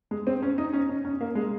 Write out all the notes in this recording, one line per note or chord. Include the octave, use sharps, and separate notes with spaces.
G#3
C4
C#4
D#4
C#4
C#4
C#4
A#3
G#3